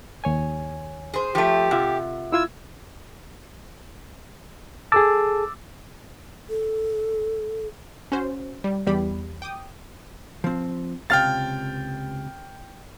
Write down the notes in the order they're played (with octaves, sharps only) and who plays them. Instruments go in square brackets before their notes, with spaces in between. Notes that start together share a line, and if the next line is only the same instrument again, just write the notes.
[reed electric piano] D#2 C#5 G#5
[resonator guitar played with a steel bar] G#4 C5
[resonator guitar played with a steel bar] F3 A3 [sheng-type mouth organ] G4
[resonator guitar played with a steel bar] C3 [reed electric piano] F4 E5 F#5
[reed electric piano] E4 F4 G#6 [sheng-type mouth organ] E6
[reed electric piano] G#4 A4 A5 [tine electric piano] D6 E6 A6
[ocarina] A4
[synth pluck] C#4 F#4 C5
G3
E2 G3 G4 B5
G5 D6 D#6
[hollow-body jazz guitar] F3 C4
[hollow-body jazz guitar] C#2 C3 F5 [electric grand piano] G5 F6 A6